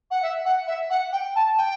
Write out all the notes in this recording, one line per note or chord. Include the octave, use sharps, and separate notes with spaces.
F#5
E5
F#5
E5
F#5
G5
A5
G5